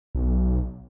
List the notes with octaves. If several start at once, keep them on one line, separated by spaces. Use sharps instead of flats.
B1